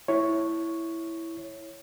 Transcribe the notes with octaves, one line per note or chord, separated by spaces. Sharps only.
E4 C#5